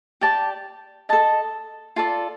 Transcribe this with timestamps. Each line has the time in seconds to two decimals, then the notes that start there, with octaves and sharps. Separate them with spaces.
0.21 G4 D5 A5
1.09 A4 D#5 A5
1.96 F4 A4 D5